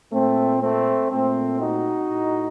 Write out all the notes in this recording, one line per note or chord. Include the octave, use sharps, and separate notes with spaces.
A#2 A3 C4
A3 C4
A#2 A3 C4
D#4 F#4
A2